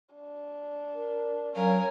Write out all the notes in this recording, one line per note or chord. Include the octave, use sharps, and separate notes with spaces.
D4
A#4
F#3 C#4 A#4 F5 G#5